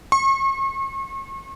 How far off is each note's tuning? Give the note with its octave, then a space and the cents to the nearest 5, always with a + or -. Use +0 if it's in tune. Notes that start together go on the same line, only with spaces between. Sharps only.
C#6 -40